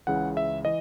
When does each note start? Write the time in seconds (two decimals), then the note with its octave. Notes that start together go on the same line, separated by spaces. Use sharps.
0.07 C#2 C#3 E3 F#5
0.37 E5
0.65 E3 D#5